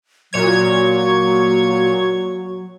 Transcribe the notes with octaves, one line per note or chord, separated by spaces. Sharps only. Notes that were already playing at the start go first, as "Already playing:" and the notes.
A#2 F#3 C#5 G#6